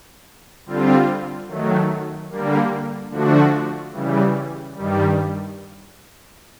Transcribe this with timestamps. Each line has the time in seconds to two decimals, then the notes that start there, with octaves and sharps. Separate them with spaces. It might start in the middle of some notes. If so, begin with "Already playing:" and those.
0.66 D3 G3 C4 F4
1.48 D#3 F#3 A3
2.30 D3 G3 A#3
3.11 D3 F3 A3 D4 F#4
3.92 C#3 E3 G3
4.75 G2 D#3 G3